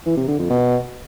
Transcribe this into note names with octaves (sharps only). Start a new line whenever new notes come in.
E3
C3
D3
F2
B2